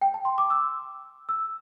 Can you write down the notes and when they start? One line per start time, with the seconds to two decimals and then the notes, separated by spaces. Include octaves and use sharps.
0.02 G5
0.14 A5
0.25 C6
0.38 D6
0.50 E6
1.29 E6